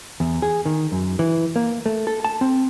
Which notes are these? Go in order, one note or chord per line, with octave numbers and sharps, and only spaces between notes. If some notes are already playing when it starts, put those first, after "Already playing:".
E2
G#4
D#3
F#2
E3
A#3
A3
A4
A5
C4